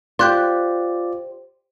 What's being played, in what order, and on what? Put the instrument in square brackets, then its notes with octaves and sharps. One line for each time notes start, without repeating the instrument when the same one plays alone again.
[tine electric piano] F4 D5 [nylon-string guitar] G4 C5 [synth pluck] C6 F#6 G6